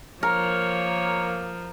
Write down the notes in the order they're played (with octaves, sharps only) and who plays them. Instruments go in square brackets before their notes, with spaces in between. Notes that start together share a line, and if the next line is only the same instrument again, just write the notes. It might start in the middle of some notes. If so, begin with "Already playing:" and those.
[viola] F3 [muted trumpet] A#3 [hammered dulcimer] A#4 [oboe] C#5